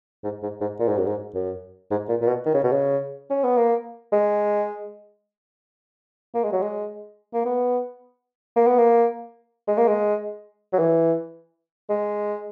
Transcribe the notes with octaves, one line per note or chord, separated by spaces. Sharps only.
G#2
G#2
G#2
A#2
G#2
F#2
G#2
F#2
G#2
A#2
A#2
B2
D#3
C#3
B2
C#3
C#4
B3
A#3
G#3
A#3
G#3
F#3
G#3
A#3
B3
A#3
B3
A#3
G#3
A#3
G#3
F#3
E3
G#3